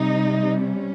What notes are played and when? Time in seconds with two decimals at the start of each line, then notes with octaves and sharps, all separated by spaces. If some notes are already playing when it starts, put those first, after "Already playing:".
Already playing: C3 G3 D#4
0.64 C#4